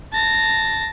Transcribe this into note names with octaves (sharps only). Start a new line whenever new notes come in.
A5 A#6